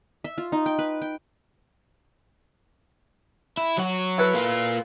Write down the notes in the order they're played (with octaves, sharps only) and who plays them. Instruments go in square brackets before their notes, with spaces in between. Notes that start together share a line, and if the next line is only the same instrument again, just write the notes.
[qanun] E5
F4
D#4
G5
B4
G5
[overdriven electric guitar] E4
F#3 F#4
[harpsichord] E4 A4 B4
[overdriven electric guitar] A#3 F4